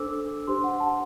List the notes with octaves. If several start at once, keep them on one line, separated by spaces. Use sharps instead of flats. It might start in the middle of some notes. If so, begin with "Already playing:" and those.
Already playing: D4 A4 C5 D6 E6
D4 G4 C5 C6
F#5
A5